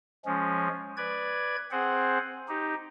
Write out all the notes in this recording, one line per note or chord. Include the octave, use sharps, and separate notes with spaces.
F3 G#3 C#4
B4 D5 G#6
C4 G#4 C5 F#5
D#4 G4